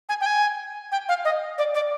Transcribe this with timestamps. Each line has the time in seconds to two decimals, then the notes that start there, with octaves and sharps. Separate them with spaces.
0.09 G#5
0.21 G5
0.26 G#5
0.92 G5
1.09 F5
1.25 D#5
1.58 D5
1.75 D5